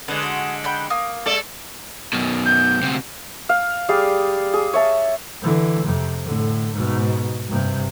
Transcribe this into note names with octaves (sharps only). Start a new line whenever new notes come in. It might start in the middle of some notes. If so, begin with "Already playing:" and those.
D3 G#3 B4
F#4
F#5 G5 B5
A#3 D#6
G#3 A4 D5
F#2 B2
G6
D2 C3
F5
G3 G#4 D5 F5
G#4
C#5 E5 A5
D3 E3
F2 C3
A2 D3
G#2 B2
G2 C3